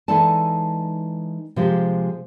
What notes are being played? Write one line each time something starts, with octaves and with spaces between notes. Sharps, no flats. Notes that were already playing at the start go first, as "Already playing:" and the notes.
E3 G#3 D#4 A4 D5 A5
C3 F3 G#3 G4